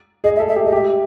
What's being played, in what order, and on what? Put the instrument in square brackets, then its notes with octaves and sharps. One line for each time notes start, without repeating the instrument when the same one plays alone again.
[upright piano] G#4 [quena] D#5
[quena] E5
[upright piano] A4
[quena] E5
[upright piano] G4
[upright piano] G#4 [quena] D#5
[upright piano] G4 [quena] E5